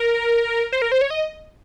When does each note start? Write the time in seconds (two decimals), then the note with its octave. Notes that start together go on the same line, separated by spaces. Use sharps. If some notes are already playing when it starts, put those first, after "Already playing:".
Already playing: A#4
0.72 C5
0.82 A#4
0.92 C5
1.01 C#5
1.10 D#5